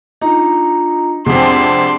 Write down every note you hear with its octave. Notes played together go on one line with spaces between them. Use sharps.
D4 D#4 F4 A#5
F2 C3 C4 D4 G#4 F#5 C6